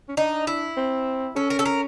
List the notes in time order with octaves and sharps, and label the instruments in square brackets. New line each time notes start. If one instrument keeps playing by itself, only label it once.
[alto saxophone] C#4
[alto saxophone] D4 [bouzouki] D#4
[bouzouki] E4
[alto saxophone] C4
[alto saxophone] C#4 [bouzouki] A4
[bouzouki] A#4
A4
A#4